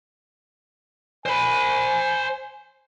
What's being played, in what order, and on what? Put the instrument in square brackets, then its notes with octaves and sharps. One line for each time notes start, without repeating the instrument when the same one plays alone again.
[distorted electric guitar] C5 B5 [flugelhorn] G#5